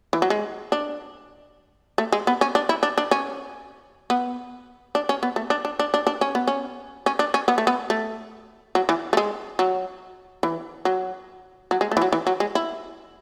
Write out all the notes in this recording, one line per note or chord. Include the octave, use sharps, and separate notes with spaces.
E3
F#3
G#3
D4
A3
G#3
B3
C#4
D4
E4
D4
D4
C#4
B3
D4
C#4
B3
A3
D4
D4
D4
D4
D4
C#4
B3
C#4
C#4
D4
C#4
B3
A3
B3
A3
F#3
E3
A3
G#3
F#3
E3
F#3
F#3
G#3
A3
E3
F#3
E3
F#3
G#3
E4